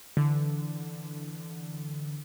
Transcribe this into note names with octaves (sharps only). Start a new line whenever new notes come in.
D3 E3